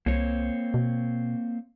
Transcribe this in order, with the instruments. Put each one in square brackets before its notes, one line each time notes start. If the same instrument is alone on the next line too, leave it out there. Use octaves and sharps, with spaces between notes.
[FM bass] C2 [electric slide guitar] A#3 C4 C#5
[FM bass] B2